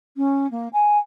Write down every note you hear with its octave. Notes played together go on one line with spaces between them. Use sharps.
C#4
A#3
G#5